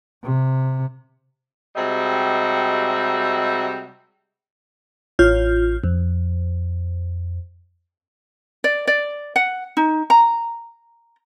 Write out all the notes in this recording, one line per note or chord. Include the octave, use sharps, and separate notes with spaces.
C3
C3 G3 G#3 F#4 D#5 E5
A1 F4 C#5 F6 G6
F2
D5
D5
F#5
D#4
A#5